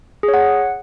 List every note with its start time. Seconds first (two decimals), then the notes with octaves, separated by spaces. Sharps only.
0.23 G#4
0.28 C#5
0.34 F#5